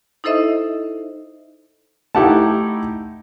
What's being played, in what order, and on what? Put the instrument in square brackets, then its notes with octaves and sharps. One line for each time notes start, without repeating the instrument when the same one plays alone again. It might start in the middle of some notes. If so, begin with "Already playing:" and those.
[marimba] D#4 E4 A4 C5 D#5 E5
[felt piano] A3 D#4 E4 [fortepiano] G4 F#5 A5